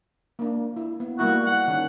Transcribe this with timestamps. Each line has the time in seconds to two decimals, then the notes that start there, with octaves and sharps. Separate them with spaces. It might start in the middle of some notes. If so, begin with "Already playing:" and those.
0.39 A#3 D4
0.76 E4
1.00 B3
1.19 G3 A#3 E4 F#4
1.46 F#5
1.68 D#3 C#4